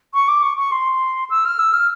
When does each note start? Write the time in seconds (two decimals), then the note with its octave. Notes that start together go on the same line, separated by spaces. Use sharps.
0.14 C#6
0.28 D6
0.43 C#6
0.58 C#6
0.72 C6
1.30 E6
1.45 F6
1.59 E6
1.74 F6